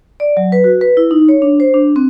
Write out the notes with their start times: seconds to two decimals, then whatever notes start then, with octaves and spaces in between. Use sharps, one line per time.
0.20 D5
0.37 F#3
0.52 B4
0.64 F#4
0.81 B4
0.97 E4
1.11 D#4
1.29 C#5
1.42 D4
1.60 C5
1.74 D4
1.96 C4